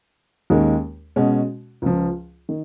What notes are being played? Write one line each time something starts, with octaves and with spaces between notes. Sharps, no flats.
D#2 D#3 G#3 C#4
B2 G#3 C#4 F#4
C#2 C#3 F3
D#3